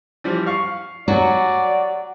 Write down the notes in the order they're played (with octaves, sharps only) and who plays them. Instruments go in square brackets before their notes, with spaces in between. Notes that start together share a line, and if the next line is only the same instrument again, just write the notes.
[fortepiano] E3 F3 G3
F5 C#6
[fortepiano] F#3 G#5 [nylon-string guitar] F#4 [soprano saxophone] D5